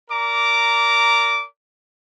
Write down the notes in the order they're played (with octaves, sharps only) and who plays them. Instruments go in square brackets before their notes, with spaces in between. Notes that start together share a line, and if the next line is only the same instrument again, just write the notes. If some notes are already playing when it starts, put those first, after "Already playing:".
[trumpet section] A#4 D5 A#5 D6